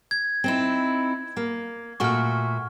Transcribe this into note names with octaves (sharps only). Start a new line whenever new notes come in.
G#6
C4 D#4 E4
A#3
A#2 A3 F#4 C#6 F6